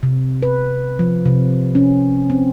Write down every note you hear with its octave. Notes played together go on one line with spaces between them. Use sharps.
C3
B4
F3
C3
C#4
C4